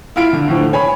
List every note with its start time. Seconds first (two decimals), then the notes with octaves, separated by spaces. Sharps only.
0.16 E4 F4 F5 D7
0.33 D3
0.48 A2 D3 F3
0.73 C#5 G#5 B5